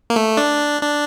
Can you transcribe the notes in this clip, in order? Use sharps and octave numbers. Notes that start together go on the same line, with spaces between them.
A#3
A3
D4
D4